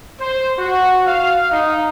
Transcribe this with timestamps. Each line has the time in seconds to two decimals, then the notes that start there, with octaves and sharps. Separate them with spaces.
0.19 C5
0.58 F#4
1.06 F5
1.50 D#4